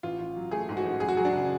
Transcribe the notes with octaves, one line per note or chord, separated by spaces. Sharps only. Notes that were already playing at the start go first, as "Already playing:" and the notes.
A1 F4
A1
F#3
A3 G#4
G#2
F#4
A1
F#2 G#4
F#4
F#3 G#4
D4
C#3